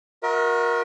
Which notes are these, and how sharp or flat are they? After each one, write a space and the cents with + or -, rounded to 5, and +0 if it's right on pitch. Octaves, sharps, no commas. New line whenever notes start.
F#4 -35 A#4 +20 E5 -45